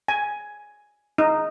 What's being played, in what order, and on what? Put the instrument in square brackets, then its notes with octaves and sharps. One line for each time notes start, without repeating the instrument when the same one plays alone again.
[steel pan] G#5
D#4